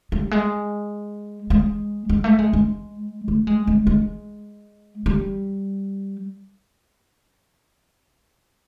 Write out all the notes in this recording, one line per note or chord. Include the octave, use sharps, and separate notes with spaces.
G3
G#3
G#3
G#3
A3
G#3
G#3
A3
G#3
G#3
G#3
G3